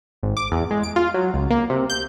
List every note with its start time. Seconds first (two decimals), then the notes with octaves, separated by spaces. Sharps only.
0.23 G#1
0.37 D6
0.51 E2
0.71 G#3
0.83 D7
0.96 F4
1.14 F#3
1.34 C#2
1.51 A#3
1.70 C3
1.90 G6